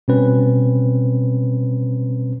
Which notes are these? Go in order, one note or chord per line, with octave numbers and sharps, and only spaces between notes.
B2 G3 C4 C#4 B4